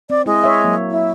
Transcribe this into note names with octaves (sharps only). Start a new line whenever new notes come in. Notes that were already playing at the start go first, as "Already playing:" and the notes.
C4 D5
G#3 E4
C#5 E5
F#3 A#3
E4